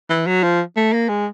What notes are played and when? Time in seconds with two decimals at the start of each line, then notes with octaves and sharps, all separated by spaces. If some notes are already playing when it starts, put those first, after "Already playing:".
0.10 E3
0.27 F#3
0.43 F3
0.77 A3
0.93 A#3
1.09 G#3